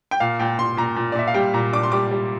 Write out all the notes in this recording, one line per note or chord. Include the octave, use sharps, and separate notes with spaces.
G5
A#2 F5
A#2 G5
A#2 C6
A#2 A#5
A#2
D5
A#2 E5
F5
G3 G5
A#2 A#5
D4 D6
C6
G3 D6
G3